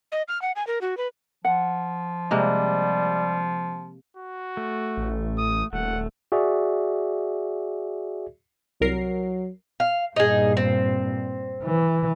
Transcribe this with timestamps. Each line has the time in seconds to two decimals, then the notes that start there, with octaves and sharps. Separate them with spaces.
0.12 D#5
0.28 F6
0.42 F#5
0.56 G#5
0.67 A#4
0.81 F#4
0.97 B4
1.45 F3 F#5
2.31 C3 G3 G#3 A#3
4.17 F#4
4.57 A3
4.97 A1
5.38 D#6
5.73 D#1 A3 F#5
6.32 F#4 G#4 D5 E5
8.81 C2 F#3 A#4 C7
9.80 F5
10.16 G2 A#2 D#4 G#4
10.57 C4
11.63 E3